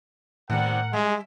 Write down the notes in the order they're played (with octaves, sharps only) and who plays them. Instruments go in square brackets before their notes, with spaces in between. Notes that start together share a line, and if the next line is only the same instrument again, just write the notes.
[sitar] D#2 C3 G3 [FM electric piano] A2 [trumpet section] A#4 F#5
[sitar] G3 E5 [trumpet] G#3